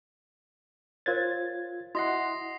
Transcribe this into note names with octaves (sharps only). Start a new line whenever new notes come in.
F4 A#4 C5 C#5 G#6 A6
E4 F#4 D#5 F#5 C6 D#6 A#6 C7